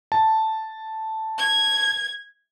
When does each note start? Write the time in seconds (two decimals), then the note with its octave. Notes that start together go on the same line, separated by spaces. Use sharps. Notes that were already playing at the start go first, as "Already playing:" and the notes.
0.12 A5
1.38 G#6